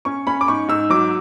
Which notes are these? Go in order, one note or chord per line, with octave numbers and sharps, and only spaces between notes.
C#4 C#6
C#4 B5
D6
G#2 C#6
G#2 E6
F#3 D6